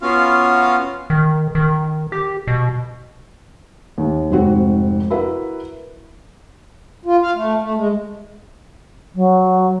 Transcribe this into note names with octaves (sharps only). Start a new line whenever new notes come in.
B3 C#4 F4 F#4 F5
D#3
D#3
G4
B2
D#2
F1 G#2 C4 F#4
E4 F#4 A#4 B4 E5
F4
F5
A3
A3
G#3
F#3